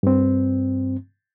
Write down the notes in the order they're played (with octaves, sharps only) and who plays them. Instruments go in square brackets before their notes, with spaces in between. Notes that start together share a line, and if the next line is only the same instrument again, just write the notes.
[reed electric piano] G2 C4